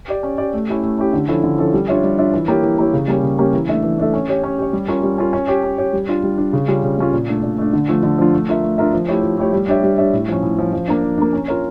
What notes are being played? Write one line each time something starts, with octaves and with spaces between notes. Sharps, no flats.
G4 D5
C#4
G4 D5
A3
C#4 E4 G4
A3
C#4 E4 G4
D3
F3 C#4 E4 A4
D3
F3 C#4 E4 A4
G3
D4 F4 C#5 E5
G3
D4 F4 C#5 E5
E3
A#3 E4 G4 C#5
E3
A#3 E4 G4 C#5
C#3
G3 A#3 C#4 G4
C#3
G3 A#3 C#4 G4
E3
A3 D4 A4 E5
E3
A3 D4 A4 E5
C#4
G4 C#5
C#4
G4 C#5
G3
C#4 F4 A#4
G3
C#4 F4 A#4
C#4
G4 C#5
C#4
G4 C#5
G3
D4 F4
G3
D4 F4
C#3
G3 C#4 F4
C#3
G3 C#4 F4
A#2
A3 D4
A#2
A3 D4
D3
F3 A3 D4 F4
D3
F3 A3 D4 F4
A3
D4 F4 A#4 E5
A3
D4 F4 A#4 E5
F3
A3 E4 G4 C#5
F3
A3 E4 G4 C#5
G3
D4 G4 C#5 E5
G3
D4 G4 C#5 E5
A2
F3 C#4
A2
F3 C#4
F3
A#3 D4
F3
A#3 D4
C#4
F4 A#4 C#5